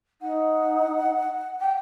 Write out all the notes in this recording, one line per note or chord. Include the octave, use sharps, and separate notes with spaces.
D#4 F#5
G5